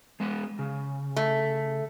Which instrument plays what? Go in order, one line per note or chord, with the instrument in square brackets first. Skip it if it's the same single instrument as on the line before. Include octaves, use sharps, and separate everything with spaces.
[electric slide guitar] G#3 B3 B4
C#3
[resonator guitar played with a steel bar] A3